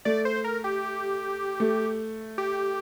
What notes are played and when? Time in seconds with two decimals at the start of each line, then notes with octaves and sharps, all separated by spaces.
0.05 A3 D5
0.25 C5
0.44 A#4
0.64 G4
1.60 A3
2.38 G4